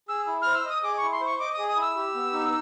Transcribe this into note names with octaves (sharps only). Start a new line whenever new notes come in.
G#4 E6
E4
C5 F6
E6
D#5 D#6
G#4 D6
C#6
E4
C6
C5 C#6
D#5 D6
G#4 D#6
D#6
E4 E6
G4
B3
D#4